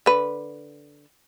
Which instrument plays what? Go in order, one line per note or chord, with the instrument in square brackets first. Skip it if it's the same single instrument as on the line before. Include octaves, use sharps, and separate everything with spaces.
[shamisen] D3 B4